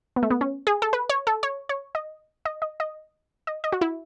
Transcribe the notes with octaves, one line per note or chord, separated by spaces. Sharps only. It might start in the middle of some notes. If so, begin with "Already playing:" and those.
B3
A3
B3
C#4
G#4
A4
B4
C#5
A4
C#5
C#5
D#5
D#5
D#5
D#5
D#5
D#5
F#4
E4